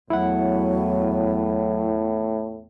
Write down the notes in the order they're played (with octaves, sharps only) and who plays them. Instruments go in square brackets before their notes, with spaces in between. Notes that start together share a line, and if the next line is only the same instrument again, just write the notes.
[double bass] E2 B3 [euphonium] A2 [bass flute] F#3 [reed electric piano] E4 F#5